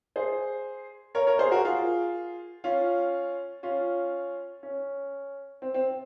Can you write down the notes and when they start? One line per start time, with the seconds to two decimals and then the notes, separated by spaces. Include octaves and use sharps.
0.16 G#4 C5
1.15 A#4 C#5
1.27 A#4 C#5
1.39 G#4 C5
1.52 F#4 A#4
1.65 F4 G#4
2.64 C#4 F4
3.63 C#4 F4
4.63 C#4
5.62 C4
5.74 C4